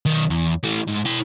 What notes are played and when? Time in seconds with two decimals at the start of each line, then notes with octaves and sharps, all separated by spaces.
0.06 B1 D#3
0.30 E2
0.64 E3 A3
0.88 G#2
1.06 E4 G5